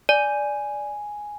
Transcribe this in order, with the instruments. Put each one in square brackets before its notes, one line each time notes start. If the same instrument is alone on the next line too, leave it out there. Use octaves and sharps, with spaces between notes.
[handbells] D5 [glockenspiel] G#5